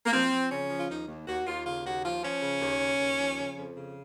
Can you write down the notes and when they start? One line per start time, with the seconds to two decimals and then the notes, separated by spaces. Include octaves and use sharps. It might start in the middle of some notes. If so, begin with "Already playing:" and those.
0.06 A#3
0.13 F3 C4
0.32 F3
0.51 C#3 C#4
0.70 F3
0.78 F4
0.90 D#2 D#4
1.08 D#2
1.27 D#2 F#4
1.46 D#2 F4
1.65 C#3 F4
1.84 D#2 F#4
2.03 F3 F4
2.23 F3 C#4
2.42 C#3
2.61 D#2
2.80 C#3
2.99 D#2
3.19 F3
3.38 C#3
3.56 F2
3.75 C#3